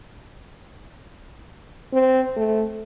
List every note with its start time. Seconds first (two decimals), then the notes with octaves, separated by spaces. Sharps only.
1.93 C4
2.36 A3